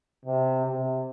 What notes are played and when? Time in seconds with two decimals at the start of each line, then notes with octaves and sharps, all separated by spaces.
0.25 C3
0.65 C3